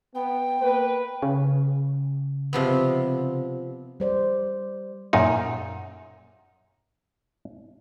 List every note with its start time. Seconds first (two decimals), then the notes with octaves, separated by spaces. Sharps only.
0.15 B3 G5
0.62 A#3 B4
1.23 C#3
2.53 C3 F3 B3
4.00 G3 C5 D5
5.13 F#2 A#2 D#4